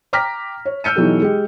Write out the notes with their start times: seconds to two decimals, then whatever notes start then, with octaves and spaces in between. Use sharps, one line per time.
0.13 G5 A#5 D6 F6 A#6 B6
0.65 C#5
0.84 E6 F6 G6 C#7 D#7
0.95 B2 E3 F#3 D#4 G4 A4
1.22 G#3 G4